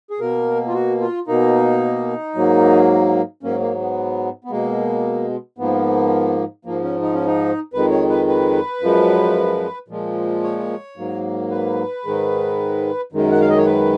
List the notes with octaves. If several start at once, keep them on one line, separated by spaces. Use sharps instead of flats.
G#4
B2 A#3 A#4
F4
F#4
F4
B2 A#3 D#4
G#2 F#3 A#3
G#2 F#3 A#3 C#4
A#3
B3
B3
B2 G#3 A#3
G#2 F3 A#3 B3
G#2 F3 A#3
C#4
D#4
C#4
D#4
F2 D#3 G#3 B4
C#5
B4
B4
F#2 F3 G#3
A#2 F3 G#3
C#5
G#2 F#3 A#3
B4
G#2 D#3 G#3
F#2 D#3 G#3
F#5
F5
D#5
C#5
B4